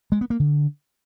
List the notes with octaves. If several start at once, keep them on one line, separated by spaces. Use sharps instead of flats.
G#3
B3
A#3
D3